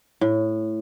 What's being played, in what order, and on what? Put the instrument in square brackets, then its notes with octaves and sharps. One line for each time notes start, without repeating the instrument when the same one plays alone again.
[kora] A2